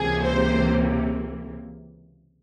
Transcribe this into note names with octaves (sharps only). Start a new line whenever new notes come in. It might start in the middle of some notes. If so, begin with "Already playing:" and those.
Already playing: C#2 C3 E3 A#3 G#4
C5